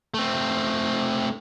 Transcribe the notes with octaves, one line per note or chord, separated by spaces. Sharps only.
A3 C4